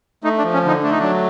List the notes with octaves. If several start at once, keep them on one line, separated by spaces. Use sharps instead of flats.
A3 D#4
D4
F3
C#4
D3 D#4
A3 D4
D#4
F#3 D4